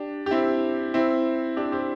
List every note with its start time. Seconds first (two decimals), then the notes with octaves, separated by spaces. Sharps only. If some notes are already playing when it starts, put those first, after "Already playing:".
Already playing: D4 G4
0.26 G4
0.31 C4 E4
0.94 C4 E4
1.57 D4 G4
1.72 G4 C5